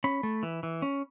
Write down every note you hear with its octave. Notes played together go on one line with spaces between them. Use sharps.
C#4 B5
A3
E3
E3
C#4